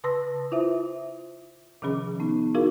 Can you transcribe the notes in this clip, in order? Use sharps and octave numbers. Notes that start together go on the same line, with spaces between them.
C#3 B4 A5 C6 E6 A#6
E4 F4 C5 E5
C3 D#3 F3 C#4 G#4
B3 D#4
D#4 E4 F#4 G#4 A#4 F5